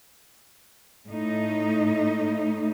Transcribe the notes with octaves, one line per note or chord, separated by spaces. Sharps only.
A2 A3 D#4